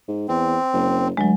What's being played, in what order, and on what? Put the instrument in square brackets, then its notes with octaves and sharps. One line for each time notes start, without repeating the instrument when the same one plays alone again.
[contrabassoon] G#2
[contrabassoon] E2 [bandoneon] C4
[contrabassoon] F#1
[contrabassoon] D2 [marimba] F#3 G#3